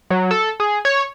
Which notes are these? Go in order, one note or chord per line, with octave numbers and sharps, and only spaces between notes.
F#3
A4
G#4
C#5